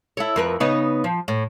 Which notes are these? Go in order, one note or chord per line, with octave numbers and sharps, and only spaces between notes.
E4 A4 C#5
F2 A#4 B4
C#3 B3 D#4
F3
A2